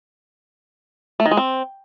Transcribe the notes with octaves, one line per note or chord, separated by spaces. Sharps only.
A3
D#3
G#3
C4